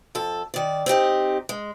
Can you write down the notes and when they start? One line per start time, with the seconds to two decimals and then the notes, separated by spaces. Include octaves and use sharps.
0.15 F2 A4
0.54 D#3 D5
0.86 C4 D#4 G4 D#5
1.49 G#3